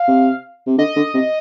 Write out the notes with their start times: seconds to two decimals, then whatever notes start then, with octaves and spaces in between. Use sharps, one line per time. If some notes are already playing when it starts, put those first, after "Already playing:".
Already playing: F5
0.08 C3
0.67 C3
0.78 D3 D#5
0.96 D3
1.14 C3